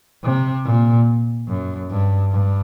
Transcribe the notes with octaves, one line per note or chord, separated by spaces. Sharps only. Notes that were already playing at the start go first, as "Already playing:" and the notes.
C3
A#2
F#2
G2
G2